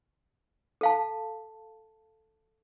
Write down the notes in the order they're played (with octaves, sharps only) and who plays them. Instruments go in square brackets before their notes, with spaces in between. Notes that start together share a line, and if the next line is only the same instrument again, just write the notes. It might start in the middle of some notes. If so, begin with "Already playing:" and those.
[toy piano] A4 F5 A5